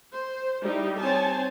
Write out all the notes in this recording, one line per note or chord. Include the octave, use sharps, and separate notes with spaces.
C5
G3 D#4 E4 G4
C4 C5 C#5 G#5 A5